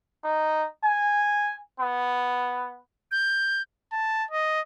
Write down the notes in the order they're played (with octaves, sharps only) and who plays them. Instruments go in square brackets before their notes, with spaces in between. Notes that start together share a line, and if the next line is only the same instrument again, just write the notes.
[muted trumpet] D#4
G#5
B3
[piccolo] G6
[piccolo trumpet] A5
D#5